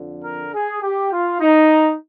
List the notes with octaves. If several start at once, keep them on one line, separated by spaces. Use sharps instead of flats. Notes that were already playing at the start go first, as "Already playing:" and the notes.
Already playing: F2 D3 F3
A#4
G#4
G4
F4
D#4